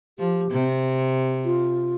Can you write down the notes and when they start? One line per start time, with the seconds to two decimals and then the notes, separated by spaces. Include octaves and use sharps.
0.19 F3 G4
0.51 C3
1.45 F4